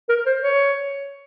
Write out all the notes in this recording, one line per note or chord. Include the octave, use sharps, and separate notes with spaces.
A#4
C5
C#5